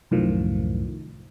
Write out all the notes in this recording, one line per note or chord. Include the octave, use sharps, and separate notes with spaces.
C2 F#2 A2 D#3 F3